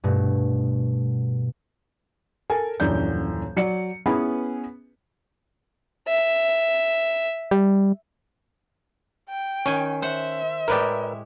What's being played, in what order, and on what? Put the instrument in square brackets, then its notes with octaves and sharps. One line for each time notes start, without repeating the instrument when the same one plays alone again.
[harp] G2 B2 A3
[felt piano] A4 A#4 G#5
D#1 F#2 E3 D4 G6
F#3 D5 C#7
B3 C#4 E4 G#4 B4
[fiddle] E5
[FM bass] G3
[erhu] G5
[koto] D#3 G#5 [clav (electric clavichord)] C#4
[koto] C5 F#5 [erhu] E5
[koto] A2 G#3 G4 [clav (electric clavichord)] A#4 B4 D5